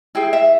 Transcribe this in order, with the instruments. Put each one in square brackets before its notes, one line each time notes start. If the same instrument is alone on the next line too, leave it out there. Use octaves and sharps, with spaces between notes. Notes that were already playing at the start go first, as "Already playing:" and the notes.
[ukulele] E4 G#4 G5
E5